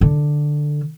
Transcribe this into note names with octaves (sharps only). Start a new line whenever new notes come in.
D3